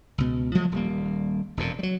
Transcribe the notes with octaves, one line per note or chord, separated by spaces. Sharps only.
C#2 B2
F3 F#3 G#3 A3
D#1 G3 A#3
E1 F2 A#2
F#3 G3